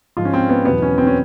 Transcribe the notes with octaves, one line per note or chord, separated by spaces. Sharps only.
G#2 F3 F4
C#4
C4
B3
E2 B2 F#3 B3
C#4
C4
C#4